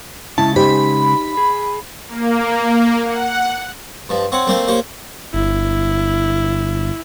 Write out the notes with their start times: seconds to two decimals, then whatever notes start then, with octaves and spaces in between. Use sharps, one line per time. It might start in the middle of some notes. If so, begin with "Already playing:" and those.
0.38 C#3 G#3 C#4 E4 A5
0.56 D#4 G4 C5 B5
1.37 G#4
2.07 A#3
3.04 F#5
4.09 G2 F3
4.32 C4 C#5 F#5
4.47 A3 A#3 C4 C5 D5
4.68 A#3 G4 C5 C#5
5.34 G1 E4